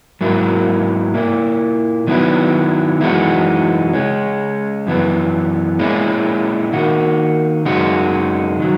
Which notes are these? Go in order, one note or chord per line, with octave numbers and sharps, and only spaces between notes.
G#2 F#3 A#3 E4
A#2 A#3 E4
D#3 F#3 B3 E4
F#2 E3 G#3 D#4 F#4
C#3 G#3 C#4
F#2 E3 B3
A#2 G#3 C#4 E4
D#3 A#3 D#4 F#4
F#2 C#3 G#3 D#4 F#4
D#3 F#3